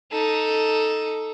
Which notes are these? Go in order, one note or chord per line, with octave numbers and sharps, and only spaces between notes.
D#4 A4